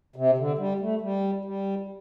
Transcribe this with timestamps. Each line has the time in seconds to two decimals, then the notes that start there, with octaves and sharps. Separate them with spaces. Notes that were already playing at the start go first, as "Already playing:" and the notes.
0.16 C3
0.37 D3
0.58 G3
0.80 A3
1.01 G3
1.45 G3